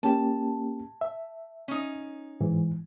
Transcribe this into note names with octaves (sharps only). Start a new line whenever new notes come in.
A#3 C#4 G4 A5
E5
C#4 D#4
G#2 E3